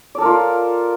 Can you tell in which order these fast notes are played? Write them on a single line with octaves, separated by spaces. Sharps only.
D5 A4 A#4 F4